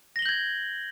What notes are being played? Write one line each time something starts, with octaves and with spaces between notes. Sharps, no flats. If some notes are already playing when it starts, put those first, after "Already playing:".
G6 G#6 A#6 F#7 G7